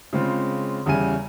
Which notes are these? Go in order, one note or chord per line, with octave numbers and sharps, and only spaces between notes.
C#3 G#3 C4 F4
E2 C#3 G3 E5 G#5 D#7